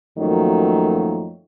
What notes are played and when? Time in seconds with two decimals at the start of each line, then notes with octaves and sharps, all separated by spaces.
0.18 F#2 D#3 F3 F#3 A3 A#3